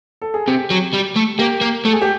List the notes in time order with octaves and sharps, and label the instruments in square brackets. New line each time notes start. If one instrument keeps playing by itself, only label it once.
[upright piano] A4
G#4
[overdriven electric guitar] C3 [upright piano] G4
[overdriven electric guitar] F#3
G3
A3
[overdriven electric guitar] A#3 [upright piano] G4
[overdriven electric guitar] A#3
[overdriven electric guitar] A3 [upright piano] A4
[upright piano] G#4
G4